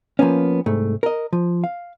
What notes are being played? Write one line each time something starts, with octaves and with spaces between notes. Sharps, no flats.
F3 A#3 B3 C#4
C2 G#2 A3
A#4 D#5
F3
F5